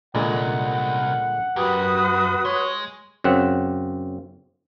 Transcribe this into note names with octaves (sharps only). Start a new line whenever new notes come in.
C2 A#2 D3 G#3 F#5
F#2 F#4 G4 B4 D#6
G#3 C#5
F#2 C#3 C4 F#5